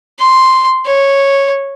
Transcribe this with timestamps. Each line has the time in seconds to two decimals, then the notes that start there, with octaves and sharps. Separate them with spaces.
0.19 C6
0.86 C#5